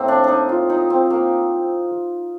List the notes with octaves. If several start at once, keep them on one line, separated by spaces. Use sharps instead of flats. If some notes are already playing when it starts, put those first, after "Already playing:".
Already playing: A2 A#3 C4
D4
D4 D#4
F4
D#4
C4
A#3